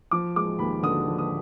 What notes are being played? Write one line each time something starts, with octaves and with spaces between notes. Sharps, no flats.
F3 D6
G#3 D6
D#2 B5
D3 D#6
F3
D#6